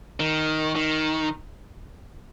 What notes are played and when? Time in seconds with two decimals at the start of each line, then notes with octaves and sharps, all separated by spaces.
0.20 D#3
0.76 D#3